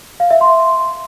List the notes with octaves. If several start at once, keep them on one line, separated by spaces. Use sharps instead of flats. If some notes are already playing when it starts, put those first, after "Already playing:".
F5
E5
C6